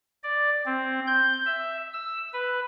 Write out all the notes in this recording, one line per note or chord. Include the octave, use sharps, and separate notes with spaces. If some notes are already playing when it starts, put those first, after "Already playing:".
D5
C4
G6
E5
E6
B4